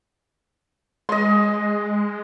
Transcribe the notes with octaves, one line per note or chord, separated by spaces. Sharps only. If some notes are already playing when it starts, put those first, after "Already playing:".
G#3 D#5 C6